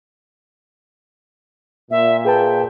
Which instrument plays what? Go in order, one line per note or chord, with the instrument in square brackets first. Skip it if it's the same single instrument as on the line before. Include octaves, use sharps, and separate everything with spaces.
[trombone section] A#2 [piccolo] E5
[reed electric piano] G#4 B4 A5 [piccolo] G5